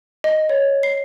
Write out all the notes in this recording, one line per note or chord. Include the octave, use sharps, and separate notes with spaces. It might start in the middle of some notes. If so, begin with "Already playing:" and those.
D#5
C#5
C7